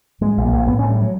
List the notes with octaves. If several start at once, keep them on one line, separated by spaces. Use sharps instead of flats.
A2 G#3
A#1
A#3
A#1
A2 B3
A2 C#4
G3
F#3